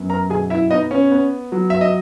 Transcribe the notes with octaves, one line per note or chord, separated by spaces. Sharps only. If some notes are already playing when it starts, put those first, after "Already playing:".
Already playing: F#2 B3
A#4 A#5
B2 G#4 G#5
E4 E5
B3 D#4 D#5
C#4 C#5
B3
F#3
E5
D#5